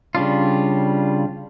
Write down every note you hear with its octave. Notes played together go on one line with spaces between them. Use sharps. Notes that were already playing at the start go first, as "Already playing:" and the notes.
C#3 G3 D4 F4